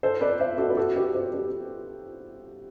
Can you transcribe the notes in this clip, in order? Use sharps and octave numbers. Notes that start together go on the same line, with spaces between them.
A4 C5
B4 D5
C5 E5
F#4 A4
B4
F#4 A4
G4 B4
A4 C5
G4 B4